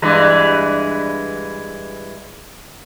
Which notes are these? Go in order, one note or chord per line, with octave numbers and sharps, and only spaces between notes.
G2 E3 G#3